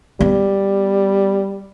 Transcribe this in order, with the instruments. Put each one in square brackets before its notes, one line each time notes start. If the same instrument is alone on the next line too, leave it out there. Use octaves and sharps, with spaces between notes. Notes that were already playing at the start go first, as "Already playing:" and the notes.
[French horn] G3 [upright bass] B3